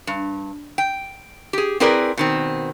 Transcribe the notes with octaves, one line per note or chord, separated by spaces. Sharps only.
G2
G5
G4 G#4
C4 E4 G#4 A#4 B4 D5
B2 D#3 C4